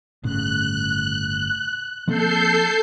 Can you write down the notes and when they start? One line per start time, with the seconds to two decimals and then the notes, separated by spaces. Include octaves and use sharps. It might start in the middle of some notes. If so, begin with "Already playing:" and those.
0.24 G1 A2 C#3 F#6
2.08 F3 A#3 C4 A4 G6 C7